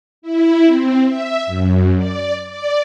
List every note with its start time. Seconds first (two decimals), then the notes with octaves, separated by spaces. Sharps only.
0.22 E4
0.64 C4
1.06 E5
1.46 F#2
1.96 D5
2.50 D5